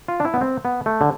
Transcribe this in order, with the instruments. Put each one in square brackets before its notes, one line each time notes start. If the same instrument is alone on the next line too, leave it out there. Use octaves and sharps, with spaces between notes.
[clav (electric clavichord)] F4
D4
E4
B3
C4
B3
A3
D3